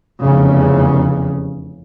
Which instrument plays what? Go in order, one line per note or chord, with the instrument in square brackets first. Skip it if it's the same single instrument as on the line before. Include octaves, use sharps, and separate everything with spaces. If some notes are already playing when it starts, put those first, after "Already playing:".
[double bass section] F1 E2 C#3